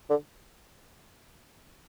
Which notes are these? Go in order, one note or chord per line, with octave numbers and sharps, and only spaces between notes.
D3